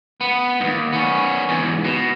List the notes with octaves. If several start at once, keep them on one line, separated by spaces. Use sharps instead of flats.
B3
D#2 G#2
B3 C#4
E2 G#2
B2